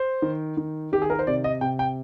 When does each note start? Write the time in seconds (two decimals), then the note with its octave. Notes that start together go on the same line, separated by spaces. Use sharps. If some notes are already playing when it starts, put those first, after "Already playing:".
Already playing: C5
0.22 D#3
0.57 D#3
0.92 D#3 G4
1.02 G#4
1.10 A#4
1.19 C5
1.27 C3 D5
1.44 D#5
1.61 C3 G5
1.79 G5